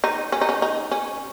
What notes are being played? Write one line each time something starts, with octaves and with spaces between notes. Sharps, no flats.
D#4
C#4
D#4
C#4
D#4
C#4